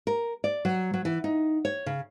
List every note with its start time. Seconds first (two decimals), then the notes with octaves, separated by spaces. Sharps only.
0.07 A#4
0.44 D5
0.65 F#3
0.94 F#3
1.05 E3
1.24 D#4
1.65 C#5
1.86 C#3